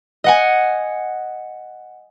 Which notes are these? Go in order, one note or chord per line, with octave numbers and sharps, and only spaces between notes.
D#5 F#5 G#5